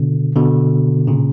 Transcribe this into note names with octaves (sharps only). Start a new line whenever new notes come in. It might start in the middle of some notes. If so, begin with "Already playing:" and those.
Already playing: B2 D3
B2 D3
A#2 C#3